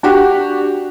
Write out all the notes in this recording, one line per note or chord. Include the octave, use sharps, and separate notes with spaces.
D4 F#4 G4